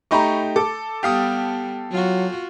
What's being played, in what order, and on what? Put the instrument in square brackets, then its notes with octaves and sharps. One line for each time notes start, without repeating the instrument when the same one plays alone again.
[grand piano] A3 D#4 G4 [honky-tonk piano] A#5 B5 C#6
[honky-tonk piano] A4 [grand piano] D6
[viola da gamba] G3 B3 [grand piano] G4 F5 D#6
[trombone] F#3 [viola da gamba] F4 F#4